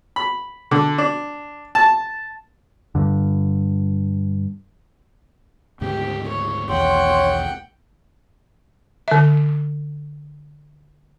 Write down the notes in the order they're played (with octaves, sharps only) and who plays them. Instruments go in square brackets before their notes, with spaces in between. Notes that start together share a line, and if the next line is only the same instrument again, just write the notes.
[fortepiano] B5
D3
D4
A5
[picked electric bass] G2 D3
[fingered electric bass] D2 G#2 C#3 [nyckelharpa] G4
[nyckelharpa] C#5
[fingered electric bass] B1 E2 D#3 [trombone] C#5 [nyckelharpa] F#5 G5 [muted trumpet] C6
[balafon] D3 E5